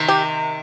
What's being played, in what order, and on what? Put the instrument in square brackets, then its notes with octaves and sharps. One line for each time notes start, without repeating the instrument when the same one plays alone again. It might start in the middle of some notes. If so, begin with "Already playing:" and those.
Already playing: [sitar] C3 D#3
[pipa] G4